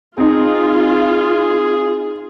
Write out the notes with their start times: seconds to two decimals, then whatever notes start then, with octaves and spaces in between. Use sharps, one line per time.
0.18 C4 D#4 F4 G#4